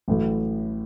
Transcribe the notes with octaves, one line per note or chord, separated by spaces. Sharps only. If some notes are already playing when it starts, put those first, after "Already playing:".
A1 A2 F#3 A3